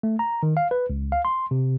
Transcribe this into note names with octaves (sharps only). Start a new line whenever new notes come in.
A3
A#5
D#3
F5
B4
C#2
F5
C6
C3